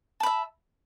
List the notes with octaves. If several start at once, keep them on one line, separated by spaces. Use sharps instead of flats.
E5 A5 B5